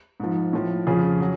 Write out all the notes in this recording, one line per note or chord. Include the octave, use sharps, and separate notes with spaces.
G#2 F3
A2 F3
F2 C#3 F3 F4 G#4
F#3